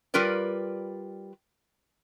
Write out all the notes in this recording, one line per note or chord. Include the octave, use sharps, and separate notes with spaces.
G3 F4 A#4 B4 D5